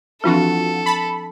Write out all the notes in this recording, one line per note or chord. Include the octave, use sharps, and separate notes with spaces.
E3 F3 C4 D4 F4 F#4 A4
A5 B5